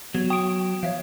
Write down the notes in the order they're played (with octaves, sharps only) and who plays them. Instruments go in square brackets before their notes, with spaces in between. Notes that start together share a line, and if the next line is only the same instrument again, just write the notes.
[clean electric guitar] F#3 [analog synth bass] B3 [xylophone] G#6
[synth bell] G5 D7 [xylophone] D#6
[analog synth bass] F3 [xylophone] C#5 E5 F5